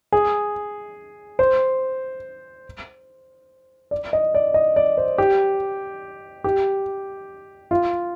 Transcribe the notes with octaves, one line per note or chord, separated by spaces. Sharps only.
G#4
C5
D5
D#5
D5
D#5
D5
C5
G4
G4
F4